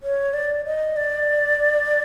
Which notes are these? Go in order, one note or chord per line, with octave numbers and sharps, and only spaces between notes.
C#5
D5
D#5
D5